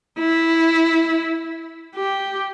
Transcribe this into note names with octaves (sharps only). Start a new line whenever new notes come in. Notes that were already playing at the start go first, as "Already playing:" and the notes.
E4
G4